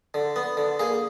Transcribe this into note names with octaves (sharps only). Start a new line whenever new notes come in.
D3
B3
D3
A#3 G#4